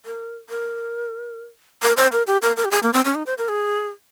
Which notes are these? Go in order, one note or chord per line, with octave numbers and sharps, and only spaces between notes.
A#4
A#4
A#4
C5
A#4
G4
A#4
A#4
G4
G#4
A#3
C4
C#4
D#4
C5
A#4
G#4